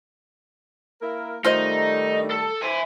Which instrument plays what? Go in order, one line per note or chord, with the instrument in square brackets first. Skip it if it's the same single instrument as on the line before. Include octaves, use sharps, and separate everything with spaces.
[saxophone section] A#3 E4 A#4
[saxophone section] D#3 G3 A3 [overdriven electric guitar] D#4 [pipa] F4 C5 D#5
[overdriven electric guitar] A4
[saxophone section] C5 [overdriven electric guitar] E5 G#5